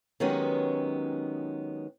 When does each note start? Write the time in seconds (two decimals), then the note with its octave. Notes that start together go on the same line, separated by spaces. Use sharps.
0.20 D#3 F#3 G#3 B3 C#4 G4